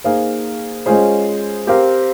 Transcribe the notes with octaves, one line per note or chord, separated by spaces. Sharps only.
A#3 D#4 G#4 C5 F5
G#3 C#4 F4 G#4 C5
C4 G4 A#4 F5